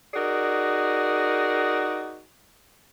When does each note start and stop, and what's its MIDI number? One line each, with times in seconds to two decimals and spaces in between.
0.14 2.21 63
0.14 2.21 66
0.14 2.21 68
0.14 2.21 70
0.14 2.21 74